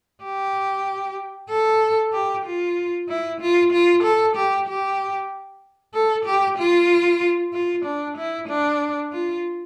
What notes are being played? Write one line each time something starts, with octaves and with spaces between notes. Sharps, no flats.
G4
A4
G4
F4
E4
F4
F4
A4
G4
G4
A4
G4
F4
F4
D4
E4
D4
F4